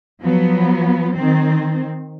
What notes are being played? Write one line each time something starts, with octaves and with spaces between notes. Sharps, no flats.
F3 F#3 B3
D#3 C4